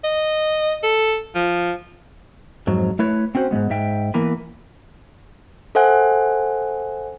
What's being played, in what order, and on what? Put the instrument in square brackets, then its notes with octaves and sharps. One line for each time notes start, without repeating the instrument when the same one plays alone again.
[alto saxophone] D#5
A4
F3
[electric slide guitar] F2 G#2 F#3
A3 E4 B4 C#5
C4 C#4 F#4 C5
G#2 G3 G#3 B3
G#2 E5 G5
E3 A#3 B3 B4
[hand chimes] A4 C5 E5 F#5 G#5 F#6